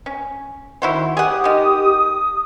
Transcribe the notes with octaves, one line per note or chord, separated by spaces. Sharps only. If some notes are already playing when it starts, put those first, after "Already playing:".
C#4
D#3 E4 F#4 C5
G4 G#4 F#5 D#6
D#3 G#3